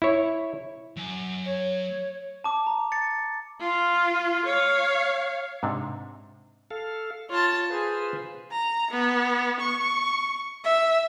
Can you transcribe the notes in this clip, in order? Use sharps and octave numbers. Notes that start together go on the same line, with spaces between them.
E4 C#5
F#3 G#5
C#5
A5 D6
A#5
A6 C#7
F4
C#5 F5
G#2 C3 D4
A4 F5
F4 C#5 A5
F4 G#4 B4 C5
A#5
B3
C#6
E5